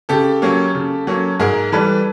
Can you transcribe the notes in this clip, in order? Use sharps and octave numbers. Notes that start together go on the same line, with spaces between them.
C#3 G4 A4
F#3 A#3 C#4
C#3
F#3 A#3 C#4
G#2 G#4 A#4
E3 G3 A4 B4